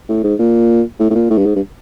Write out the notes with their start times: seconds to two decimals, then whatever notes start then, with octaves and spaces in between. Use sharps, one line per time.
0.09 A2
0.24 G#2
0.39 A#2
0.99 A2
1.10 A2
1.15 A#2
1.30 A2
1.37 G2
1.45 G#2
1.55 G2